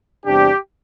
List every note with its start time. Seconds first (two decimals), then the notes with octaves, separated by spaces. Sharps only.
0.26 E2 C3 G3 D4 G4